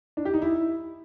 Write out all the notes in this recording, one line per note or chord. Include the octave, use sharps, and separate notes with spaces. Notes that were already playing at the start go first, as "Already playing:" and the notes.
D4
G4
D#4
E4